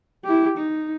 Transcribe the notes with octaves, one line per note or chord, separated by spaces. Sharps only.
E4 G4
D#4